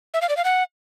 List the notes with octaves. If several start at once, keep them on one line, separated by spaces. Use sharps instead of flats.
E5
F5
D5
F5
F#5